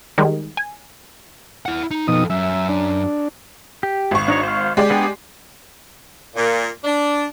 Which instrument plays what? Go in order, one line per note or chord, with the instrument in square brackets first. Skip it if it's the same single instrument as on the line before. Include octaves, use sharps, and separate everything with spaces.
[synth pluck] D#3 G3 G#3
G#5
[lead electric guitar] E4 F#5
D#4
[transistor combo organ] B2 D#4 D#6 [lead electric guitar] F3 A4
[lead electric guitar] F#2 [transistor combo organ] E5
[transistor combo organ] D4
[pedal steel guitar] G4
[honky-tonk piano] G#1 C#6
[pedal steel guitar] D4 D#4 C#5
C5 F5
[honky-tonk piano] G#3 G4 D5
[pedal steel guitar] B3 D4 G#4
[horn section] A#2
D4